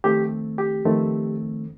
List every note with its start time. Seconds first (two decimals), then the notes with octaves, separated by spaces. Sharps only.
0.04 F2 D#3 A3 C4 G4
0.58 G4
0.85 F2 D#3 A3 C4